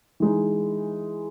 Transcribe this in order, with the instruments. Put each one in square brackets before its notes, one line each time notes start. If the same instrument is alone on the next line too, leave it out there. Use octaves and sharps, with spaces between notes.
[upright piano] E3 G#3 D#4